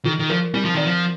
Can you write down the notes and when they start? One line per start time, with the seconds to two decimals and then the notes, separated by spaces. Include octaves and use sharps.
0.05 D#3 F4
0.19 D#3
0.30 F3 A#4
0.54 G3 C4
0.65 F3
0.75 D#3 D5
0.85 F3